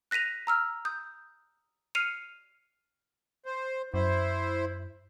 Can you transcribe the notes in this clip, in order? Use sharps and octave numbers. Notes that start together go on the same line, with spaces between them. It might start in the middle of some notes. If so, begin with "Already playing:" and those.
F#6 A#6 B6 D#7 F7
A#5 E6 F6
D#6 G6
F6 C7 C#7 D#7 F7
C5
F#2 E4 C5